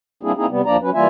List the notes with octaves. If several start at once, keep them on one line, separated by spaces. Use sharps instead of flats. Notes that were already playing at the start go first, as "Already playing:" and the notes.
G3 A#3 C4 D4 E4 G#4
A#3 C4 D#4 E4 G#4
C3 G3 B3
D#2 F3 A#3 D4 D5 A#5
F#3 C#4 B4
E3 G3 A#3 F4 E5 G#5